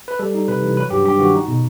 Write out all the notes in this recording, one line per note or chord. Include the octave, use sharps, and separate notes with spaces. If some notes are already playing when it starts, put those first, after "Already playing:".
B4
G3 A4
D#4
C3 B4
E3
F#3 B4
G2 G4
G2 G4
D#3 F#4
D#4
B2